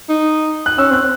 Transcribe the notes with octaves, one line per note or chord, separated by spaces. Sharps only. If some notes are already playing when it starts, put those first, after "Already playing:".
D#4
F#6
C#4 E6
C4 F#6